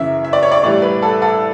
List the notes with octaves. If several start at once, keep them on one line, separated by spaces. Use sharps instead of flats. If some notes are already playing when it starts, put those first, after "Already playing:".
Already playing: F#2 C#3 E3 E5
E5
D5
C#5
D5
A2 E3 G3 D5
B4
A4
A4